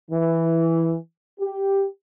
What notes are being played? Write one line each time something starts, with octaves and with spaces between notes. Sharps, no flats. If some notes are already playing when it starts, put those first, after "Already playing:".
E3
G4